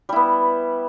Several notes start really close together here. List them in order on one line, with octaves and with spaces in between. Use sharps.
G3 E4 B3